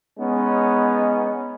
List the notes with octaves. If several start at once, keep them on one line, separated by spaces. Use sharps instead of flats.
G#3 B3 C#4 D#4